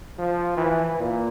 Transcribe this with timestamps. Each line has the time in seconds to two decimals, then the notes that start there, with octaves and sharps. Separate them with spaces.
0.18 F3
0.57 E3
0.99 A#2